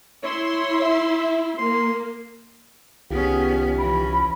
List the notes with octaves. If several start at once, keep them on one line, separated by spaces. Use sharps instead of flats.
E4 C#5 C6
E5
A#3 C6
C2 D#3 B3 C#4 F4 G4 G#4
E3 C#4 B5